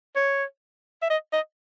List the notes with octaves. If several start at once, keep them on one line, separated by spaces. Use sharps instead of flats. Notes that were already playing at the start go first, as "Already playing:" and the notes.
C#5
E5
D#5
D#5